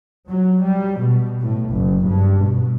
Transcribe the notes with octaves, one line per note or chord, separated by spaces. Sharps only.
F#3
G3
B2
A2
F#1
G2
B2